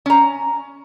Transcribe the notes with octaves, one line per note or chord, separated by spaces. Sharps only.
C#4 A#5